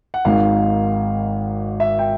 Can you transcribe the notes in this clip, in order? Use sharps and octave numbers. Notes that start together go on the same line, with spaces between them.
F#5
G#1 G#2 D#3 F5
E5
G5